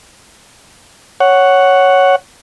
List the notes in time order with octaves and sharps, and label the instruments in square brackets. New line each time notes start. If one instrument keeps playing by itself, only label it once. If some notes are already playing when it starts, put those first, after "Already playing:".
[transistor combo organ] C#5 F#5